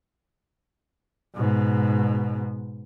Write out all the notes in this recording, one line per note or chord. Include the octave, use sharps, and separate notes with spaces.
G#2 B2